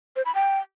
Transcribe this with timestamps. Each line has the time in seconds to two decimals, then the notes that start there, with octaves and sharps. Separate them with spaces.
0.16 C5
0.26 B5
0.35 G5